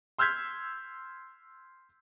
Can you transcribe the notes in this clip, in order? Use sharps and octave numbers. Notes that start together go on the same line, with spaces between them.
C6 E6 F6 G6 G#6 B6